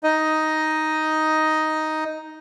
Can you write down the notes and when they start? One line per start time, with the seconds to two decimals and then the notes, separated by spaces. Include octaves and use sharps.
0.04 D#4 D#5